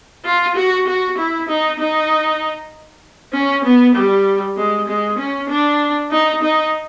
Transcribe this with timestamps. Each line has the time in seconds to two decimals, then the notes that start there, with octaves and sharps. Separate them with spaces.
0.25 F4
0.56 F#4
0.87 F#4
1.18 E4
1.48 D#4
1.79 D#4
3.33 C#4
3.64 B3
3.95 G3
4.57 G#3
4.88 G#3
5.18 C#4
5.49 D4
6.11 D#4
6.42 D#4